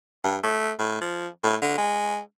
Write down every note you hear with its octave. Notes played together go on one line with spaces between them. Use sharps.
G2
A3
A2
F3
A2
D3
G#3